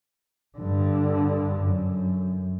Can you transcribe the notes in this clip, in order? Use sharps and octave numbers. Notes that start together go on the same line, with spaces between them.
G2 D3
F#2